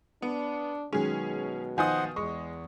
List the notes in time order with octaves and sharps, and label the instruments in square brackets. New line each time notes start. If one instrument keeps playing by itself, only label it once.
[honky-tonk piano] B3 [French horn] D4
[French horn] B2 [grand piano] D#3 F#3 G#3 [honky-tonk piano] C#4 G#4
[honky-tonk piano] D#3 F3 D#6 [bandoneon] C5 D#5 F#5 [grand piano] G#5
[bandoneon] E2 [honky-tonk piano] G#3 [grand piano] C#6